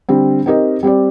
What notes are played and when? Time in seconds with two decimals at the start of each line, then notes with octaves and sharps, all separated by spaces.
0.09 D3 G3 C4
0.46 C4 D#4 G4 A#4 D#5
0.83 G3 C4 G4 D5